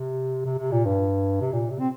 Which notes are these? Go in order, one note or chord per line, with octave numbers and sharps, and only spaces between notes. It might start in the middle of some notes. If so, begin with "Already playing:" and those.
Already playing: C3
C3
C3
A#2
G2
C3
A#2
C3
C4